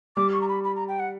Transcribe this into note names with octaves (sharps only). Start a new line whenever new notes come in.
G3 D6
C#6
A#5
B5
B5
A#5
G5
F#5